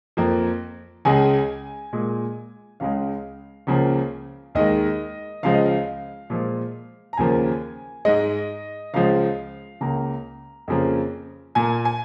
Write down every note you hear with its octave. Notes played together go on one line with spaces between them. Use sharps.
F2 F3 A#3
C#2 C#3 G#3 G#5
A#2 G#3
C#2 C#3 G#3 F5
C#2 C#3 F3 A#3
D#2 D#3 G#3 D#5
C#2 C#3 F3 G#3 F5
D#5
F5
A#2 F3 G#3
A#5
D#2 C#3 F3 A#3 G#5
G#2 G#3 D#5
C#2 C#3 F3 G#3 F5
C#2 C#3 A#3 A#5
F2 C#3 F3 A#3
A#2 A#3 G#5
G#5